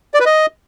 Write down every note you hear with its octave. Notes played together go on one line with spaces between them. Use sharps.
D5
B4
D#5